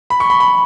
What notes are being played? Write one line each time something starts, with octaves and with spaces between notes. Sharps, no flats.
B5
C#6
B5
B5